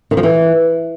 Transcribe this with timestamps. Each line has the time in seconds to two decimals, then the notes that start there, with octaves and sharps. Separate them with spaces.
0.11 D#3
0.17 F3
0.23 E3